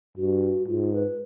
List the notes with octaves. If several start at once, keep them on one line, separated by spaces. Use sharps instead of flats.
G2 F#4
G#2 F4
B4